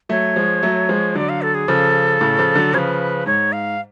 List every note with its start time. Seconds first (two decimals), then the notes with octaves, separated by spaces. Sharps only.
0.09 F#3 A3 C#5
0.36 F3 G#3
0.63 F#3 A3
0.89 F3 G#3
1.15 D3 F#3 D5
1.29 F5
1.42 A4
1.55 G#4
1.68 C#3 F3 A4
2.21 A2 C#3
2.38 C#3 F3
2.55 D3 F#3
2.73 C#3 F3 C#5
2.78 B4
3.26 G#2 C#5
3.52 F5